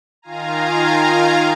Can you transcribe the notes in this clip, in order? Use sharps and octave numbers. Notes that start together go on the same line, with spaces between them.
D#3 F4 F5 G#5 A#5